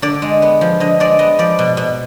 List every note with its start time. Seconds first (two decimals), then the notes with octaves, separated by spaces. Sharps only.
0.02 D3 D5
0.22 G#3
0.42 B3
0.61 F3
0.80 D3 D#5
1.00 G#3 D5
1.19 B3 D#5
1.39 F3 D5
1.59 B2
1.77 B2